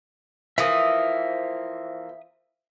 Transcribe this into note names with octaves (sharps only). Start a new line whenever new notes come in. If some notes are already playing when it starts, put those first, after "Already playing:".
E3 F3 A#3 E5 D#6